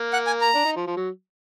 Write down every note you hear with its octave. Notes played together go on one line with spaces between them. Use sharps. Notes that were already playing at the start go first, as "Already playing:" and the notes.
Already playing: A#3
F#5
G#5
A#5
D4
D#4
F3
F3
F#3